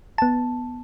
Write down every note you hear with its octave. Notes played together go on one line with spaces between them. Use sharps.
B3 A5